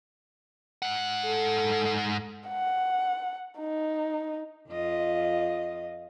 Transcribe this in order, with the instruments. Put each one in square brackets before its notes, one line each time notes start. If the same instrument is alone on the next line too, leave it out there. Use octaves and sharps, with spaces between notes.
[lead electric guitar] G#2 F#5
[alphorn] A4
[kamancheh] F#5
D#4
[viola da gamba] F2 F4 D#5